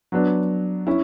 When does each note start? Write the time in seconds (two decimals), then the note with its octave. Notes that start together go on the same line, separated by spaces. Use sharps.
0.12 F#3 B3 D4
0.87 C#4 E4